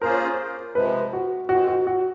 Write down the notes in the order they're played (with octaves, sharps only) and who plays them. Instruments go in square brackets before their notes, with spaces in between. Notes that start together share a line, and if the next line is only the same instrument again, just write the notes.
[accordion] A#3 C#4 F4 G#4 C5 [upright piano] A#4
[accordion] C3 F3 G#3 [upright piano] B4
[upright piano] F#4
[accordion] D#3 G#3 C4 [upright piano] F#4
[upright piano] F#4
F#4